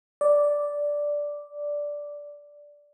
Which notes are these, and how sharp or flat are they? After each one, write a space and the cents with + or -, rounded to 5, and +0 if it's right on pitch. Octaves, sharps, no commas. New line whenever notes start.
D5 -5